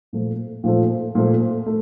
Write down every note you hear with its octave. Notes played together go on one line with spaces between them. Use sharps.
A#2 F3 A3
A#2 F3 A3
A#2 F3 A3
A3